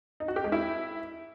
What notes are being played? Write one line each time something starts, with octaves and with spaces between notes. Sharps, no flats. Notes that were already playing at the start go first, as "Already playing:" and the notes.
D#4
F#4
G4
G#3
E4